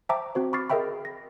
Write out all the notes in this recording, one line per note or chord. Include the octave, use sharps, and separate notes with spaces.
C5 E5 G5 A5 A#5 D6
C4 F#4 C5
B5 C#6 D6 F6 A6 C7
G#4 A#4 D#5 E5 G5 B5
A#6